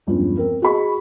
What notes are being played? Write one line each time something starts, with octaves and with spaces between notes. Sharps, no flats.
E1 G2 F3 C#4
C4 A#4
F#4 G#4 D#5 B5 C#6